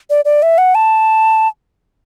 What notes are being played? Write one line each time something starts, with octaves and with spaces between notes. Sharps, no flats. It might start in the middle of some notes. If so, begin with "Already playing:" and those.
D5
D5
E5
F#5
A5